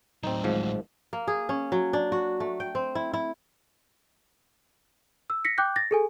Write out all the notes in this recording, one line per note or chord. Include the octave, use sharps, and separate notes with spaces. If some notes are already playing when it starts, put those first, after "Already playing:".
A2 F#3 C4 D#4
G#1 G#2 F3
A#3
G#4
C#4
F#3
D4
F#4
A3
G5
C4
E4
E4
E6
A#6 B6 C#7
G5 D6 F#6 G6
A6 A#6
G#4 A4 G#5